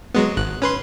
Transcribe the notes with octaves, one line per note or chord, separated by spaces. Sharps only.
F#3 G#3 B3
G#1 F#6
C#4 B4 C6